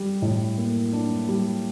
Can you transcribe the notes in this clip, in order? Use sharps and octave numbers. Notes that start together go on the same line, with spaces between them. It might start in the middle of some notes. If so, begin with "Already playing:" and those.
Already playing: G3
A2
A#3
D4
G3